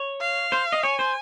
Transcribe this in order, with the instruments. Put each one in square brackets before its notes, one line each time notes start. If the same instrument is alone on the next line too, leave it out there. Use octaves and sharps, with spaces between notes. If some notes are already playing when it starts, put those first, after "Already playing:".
Already playing: [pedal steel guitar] C#5
[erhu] F5
[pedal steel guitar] C5
D#5
[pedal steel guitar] C#5 [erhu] G#5
[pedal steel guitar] C5